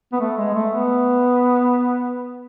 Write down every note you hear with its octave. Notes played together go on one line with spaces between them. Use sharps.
B3
A3
G#3
A3
B3